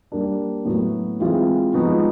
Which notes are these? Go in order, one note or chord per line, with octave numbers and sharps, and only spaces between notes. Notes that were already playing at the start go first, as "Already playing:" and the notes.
G3 A#3 D4
A2 F#3 B3
E3 G#3 C4 F4 G#4
F3 G#3 B3 D#4 F#4